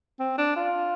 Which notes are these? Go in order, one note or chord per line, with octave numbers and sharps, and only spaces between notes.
C4
D4
F4